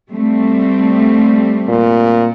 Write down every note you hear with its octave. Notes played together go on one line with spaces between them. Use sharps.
G3 A3 C4
A#2